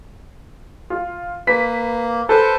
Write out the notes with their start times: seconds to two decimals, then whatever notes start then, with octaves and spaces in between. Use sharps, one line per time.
0.90 F4
1.47 A#3 B4 B6
2.29 A4 B4 C5